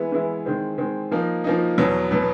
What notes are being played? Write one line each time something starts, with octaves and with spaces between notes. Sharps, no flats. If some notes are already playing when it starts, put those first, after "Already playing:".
Already playing: E3 G#3 B3 E4
E3 G#3 B3 E4
D#3 G#3 C4
D#3 G#3 C4
F3 A#3 D#4
F3 A#3 D#4
E2 B2 F#3 B3
B2 F#3 B3